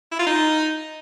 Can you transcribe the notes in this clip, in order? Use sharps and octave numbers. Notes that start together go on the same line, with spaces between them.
E4
F4
D#4